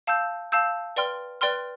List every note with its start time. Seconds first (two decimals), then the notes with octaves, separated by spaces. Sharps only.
0.07 F5 A5 E6 G6
0.52 F5 A5 E6 G6
0.96 B4 D5 G5 C6 F6
1.41 B4 D5 G5 C6 F6